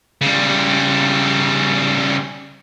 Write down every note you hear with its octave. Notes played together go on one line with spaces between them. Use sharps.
C#3 G3